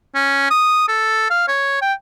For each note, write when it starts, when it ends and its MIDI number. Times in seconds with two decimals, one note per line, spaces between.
0.15 0.49 61
0.50 0.87 87
0.88 1.26 69
1.30 1.46 77
1.48 1.81 73
1.81 1.93 79